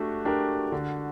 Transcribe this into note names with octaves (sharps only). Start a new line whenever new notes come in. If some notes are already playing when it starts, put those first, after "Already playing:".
Already playing: A3 D4 F#4 G4
D4 G4 A#4
D3